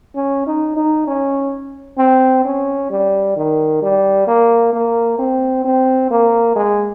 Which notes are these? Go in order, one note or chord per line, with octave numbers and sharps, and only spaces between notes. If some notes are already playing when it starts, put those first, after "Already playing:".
C#4
D#4
D#4
C#4
C4
C#4
G3
D#3
G3
A#3
A#3
C4
C4
A#3
G#3